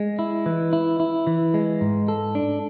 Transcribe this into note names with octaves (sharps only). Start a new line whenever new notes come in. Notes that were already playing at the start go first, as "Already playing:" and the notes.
Already playing: G#3
E4
E3
E4
E4
E3
G#3
G#2
A4
D4